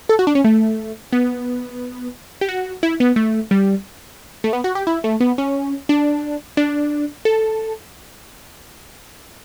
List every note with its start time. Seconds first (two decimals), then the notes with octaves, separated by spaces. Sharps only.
0.09 A4
0.19 F#4
0.27 D4
0.35 C#4
0.44 A3
1.13 B3
2.41 G4
2.49 F#4
2.83 E4
3.00 B3
3.16 A3
3.51 G3
4.44 A3
4.53 B3
4.64 F#4
4.75 G4
4.87 E4
5.04 A3
5.20 B3
5.38 C#4
5.89 D4
6.57 D4
7.25 A4